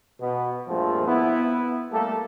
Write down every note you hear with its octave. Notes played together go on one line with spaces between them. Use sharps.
B2 B3
G2 A#2 F3 G#3 A3 C4
B3 E4
G3 A3 A#3 G4 A4